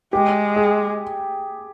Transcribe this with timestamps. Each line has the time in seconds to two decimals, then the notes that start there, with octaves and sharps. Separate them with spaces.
0.13 G#3 G4
0.56 G#4